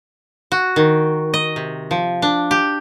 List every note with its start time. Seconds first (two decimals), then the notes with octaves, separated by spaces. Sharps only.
0.52 F#4
0.76 D#3
1.34 D#5
1.56 C3
1.91 F3
2.22 D4
2.51 G4